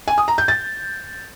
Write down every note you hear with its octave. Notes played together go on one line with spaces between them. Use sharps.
G#5
D#6
A#5
G6
A6